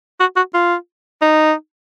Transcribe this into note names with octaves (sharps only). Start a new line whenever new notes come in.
F#4
F#4
F4
D#4